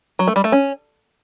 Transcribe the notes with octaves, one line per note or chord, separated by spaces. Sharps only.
F#3
A3
G3
A3
C#4